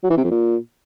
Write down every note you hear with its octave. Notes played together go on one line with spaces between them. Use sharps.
F#3
E3
C3
F2
A#2